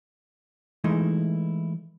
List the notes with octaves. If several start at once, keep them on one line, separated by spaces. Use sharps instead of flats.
E3 G#3 A3 D#4 E4